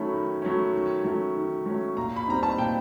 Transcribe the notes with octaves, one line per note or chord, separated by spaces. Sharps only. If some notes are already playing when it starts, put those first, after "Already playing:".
Already playing: D#3 F#3 A3 C#4 B5
D#3
F#3 A3 C#4
D#3
F#3 A3 C#4
D#3
F#3 A3 C#4
A#2 A#5
B5
G3 C4 D#4 A#5
A5
A#2 G5